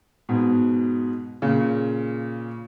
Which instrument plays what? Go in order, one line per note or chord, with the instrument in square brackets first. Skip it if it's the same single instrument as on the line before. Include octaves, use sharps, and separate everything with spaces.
[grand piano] G#2 B2
A#2 C#3